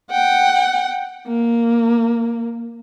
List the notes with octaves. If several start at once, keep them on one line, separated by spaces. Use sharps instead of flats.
F#5 G5
A#3